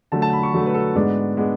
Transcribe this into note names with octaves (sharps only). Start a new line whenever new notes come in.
D3 F#3 A3 A5
A5
B5
C#6
D3 F#3 A3
B4
A4
G#2 G#3 B3 D4
G#3 B3 D4